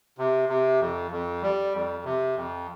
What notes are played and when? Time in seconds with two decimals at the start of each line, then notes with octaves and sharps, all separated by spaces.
0.18 C3
0.49 C3
0.80 F2
1.11 F2
1.42 G3
1.73 F2
2.04 C3
2.36 F2